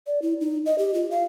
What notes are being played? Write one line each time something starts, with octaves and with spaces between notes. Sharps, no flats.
D5
E4
D#4
D#5
G4
F4
F5